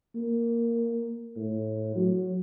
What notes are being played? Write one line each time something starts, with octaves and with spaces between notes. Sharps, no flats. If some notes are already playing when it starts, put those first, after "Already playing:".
A#3
A2
F#3